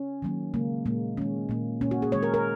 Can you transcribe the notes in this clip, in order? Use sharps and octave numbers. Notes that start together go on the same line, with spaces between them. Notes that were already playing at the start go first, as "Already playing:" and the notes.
Already playing: C#4
D#3 F#3 A#3
C#3 G#3 A#3
A#2 G#3 A#3
D#3 G#3 C#4
A#2 A#3
A#2 A#3 C#4
F#4
G#4
D#3 G#3 C#5
A#4
A#4